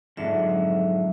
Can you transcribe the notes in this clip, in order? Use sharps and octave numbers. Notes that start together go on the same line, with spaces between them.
F2 G#2 D3 F#3 E5